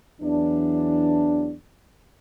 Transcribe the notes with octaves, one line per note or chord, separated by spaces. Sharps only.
E2 E3 F#3 D4